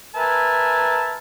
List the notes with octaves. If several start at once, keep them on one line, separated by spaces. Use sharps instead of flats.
A#4 B4 E5 G#5 A5